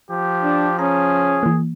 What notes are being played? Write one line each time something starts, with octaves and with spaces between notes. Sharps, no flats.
F3 G4
D4
C#4 G#4 A#5
E3 A#3